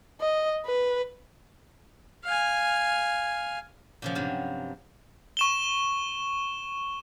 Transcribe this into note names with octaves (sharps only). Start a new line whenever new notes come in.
D#5
B4
F5 G#5
A#2 C#3 F3
G2 C3 F3 F#3
C#6 E7 G7